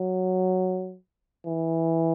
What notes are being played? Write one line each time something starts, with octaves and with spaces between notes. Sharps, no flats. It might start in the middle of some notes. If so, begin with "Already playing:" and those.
Already playing: F#3
E3